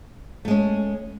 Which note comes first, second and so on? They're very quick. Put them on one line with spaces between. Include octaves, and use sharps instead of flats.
A3 G#3 C#4